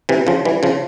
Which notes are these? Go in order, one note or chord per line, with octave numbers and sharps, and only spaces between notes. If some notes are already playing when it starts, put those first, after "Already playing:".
C3 E3
C#3 F3
E3 G3
C#3 F3